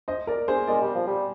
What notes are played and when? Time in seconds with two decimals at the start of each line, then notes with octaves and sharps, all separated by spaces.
0.08 C5 D#5
0.27 A#4 D5
0.48 G#4 C5
0.67 G#3 A#4 D5
0.81 G3
0.95 F3
1.07 G3